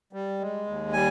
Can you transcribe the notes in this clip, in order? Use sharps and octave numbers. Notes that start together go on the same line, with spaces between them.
G3
G#3
D#2
G3 G#5